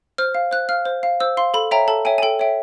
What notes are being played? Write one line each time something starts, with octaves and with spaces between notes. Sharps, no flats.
C5 F6
F5
C5 F#6
F5 F6
C5
F5
C5 E6
F5 C6
A4 B5
C#5 E5 G5 A#5
A4 A5
C#5 E5 G5 G#5
G#5
A4 G5
C#5 E5 G5